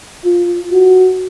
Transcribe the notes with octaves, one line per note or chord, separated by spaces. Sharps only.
F4
F#4